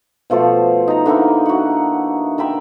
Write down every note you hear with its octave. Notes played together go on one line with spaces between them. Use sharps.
B2 F3 A3 C5
D#4 A#5
D3 A#3 D#4 E4
F#4 F#5
A#4 E5 G5 B5